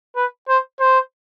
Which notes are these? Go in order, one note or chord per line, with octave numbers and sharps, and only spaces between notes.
B4
C5
C5